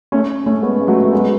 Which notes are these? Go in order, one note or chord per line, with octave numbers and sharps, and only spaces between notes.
A3 C#4
A3 C#4
G#3 B3
G#3
F#3 A3
A3
G#3 B3